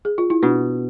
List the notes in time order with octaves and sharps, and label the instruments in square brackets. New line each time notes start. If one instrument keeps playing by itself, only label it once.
[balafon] G#4
F4
E4
[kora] B2 [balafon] D4